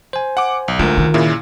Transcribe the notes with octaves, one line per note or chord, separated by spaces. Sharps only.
C5 G#5
F#5 D6
B1
D2 G#3 F4 A#4
D#3
A#2 C#3 E4